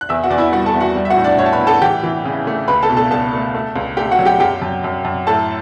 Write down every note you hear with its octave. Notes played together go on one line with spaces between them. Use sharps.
F#6
E2 E5 E6
F#4 F#5
E2 D5
E4 E5
G3 F#4 F#5
A4 A5
E2
F#4 F#5
G3
E5
F#4 F#5
A2
D4 D5
A2 C#5
A5
B4 B5
A2
A4 A5
E3 G4 G5
E3
C#3
A3
C#2 B4 B5
A4 A5
B2
A4 A5
C#2 A4 A5
A3
A3
C#2
A3 G4 G5
F#4 F#5
F#3
G4 G5
F#2 G4 G5
F#2
F#2
F#2
A2 A4 A5